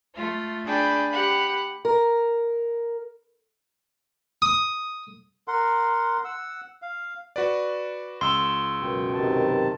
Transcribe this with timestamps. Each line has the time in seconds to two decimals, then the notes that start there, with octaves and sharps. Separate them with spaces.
0.16 A3 F4
0.66 D4 G#4 G5 A5 B5
1.10 G4 F#5 B5
1.85 A#4
4.42 D#6
5.48 A#4 F#5 C6
6.25 F#5 E6
6.82 F5
7.36 F#4 B4 D5
8.21 C#2 C6 E6
8.82 F#2 B2 G5
9.14 C3 D#3 A5